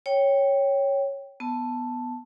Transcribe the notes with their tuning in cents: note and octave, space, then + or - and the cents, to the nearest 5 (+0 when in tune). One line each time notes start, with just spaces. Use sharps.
C#5 +0 G5 +0
B3 +0 A5 +0